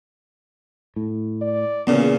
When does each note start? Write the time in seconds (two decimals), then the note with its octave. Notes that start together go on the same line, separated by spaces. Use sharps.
0.96 A2
1.42 D5
1.87 E2 A#2 C#3 B3 C#4